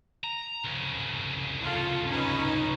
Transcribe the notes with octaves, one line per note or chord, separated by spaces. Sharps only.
A#5
C2 C#3
F4 A4
C#4 D#4 B4